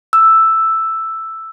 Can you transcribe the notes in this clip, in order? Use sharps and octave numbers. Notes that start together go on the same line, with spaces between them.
E6